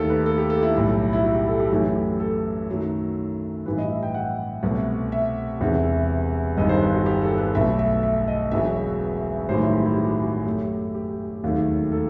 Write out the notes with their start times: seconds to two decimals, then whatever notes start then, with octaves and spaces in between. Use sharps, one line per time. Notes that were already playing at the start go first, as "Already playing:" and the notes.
Already playing: D#2 D#3 A3 G4 A4
0.10 B4
0.26 A4
0.38 G4
0.50 A4
0.62 E4
0.75 B1 A2 G3
1.13 E4
1.23 F#4
1.35 G4
1.48 A4
1.60 G4
1.72 F#2 E3 A3 F#4
1.96 G4
2.20 A4
2.69 F#2 D#3 F#3 A3
3.66 A1 G2 E3 B4
3.78 D#5
3.90 E5
4.03 G5
4.14 F#5
4.63 C2 B2 A3
5.12 E5
5.60 E1 E2 C3 E3
6.57 G1 G2 D#3 D#5
6.69 C5
6.82 B4
6.94 F#4
7.06 G4
7.22 A4
7.38 B4
7.54 B1 B2 A3 E5
7.79 E5
8.03 E5
8.28 D#5
8.51 E1 E2 B2 F#3 E5
9.49 A1 G2 D#3 F#3 A3 C5
9.61 E4
9.73 G4
9.85 E4
9.98 F#4
10.22 F#4
10.46 F#2 F#3 A3 G4
10.95 G4
11.43 E1 D#2 D#3 F#3 A3
11.92 A4